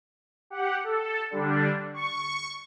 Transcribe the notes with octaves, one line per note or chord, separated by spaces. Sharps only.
G4 F#5
A4
D3 G3 D4
C#6